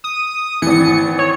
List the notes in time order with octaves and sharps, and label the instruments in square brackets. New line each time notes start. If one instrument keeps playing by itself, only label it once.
[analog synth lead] D#6
[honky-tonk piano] G#1 E3 [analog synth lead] C#7
[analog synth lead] C#5